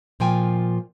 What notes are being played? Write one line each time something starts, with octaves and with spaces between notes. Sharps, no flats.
A#2 F3 F4 G5 G#5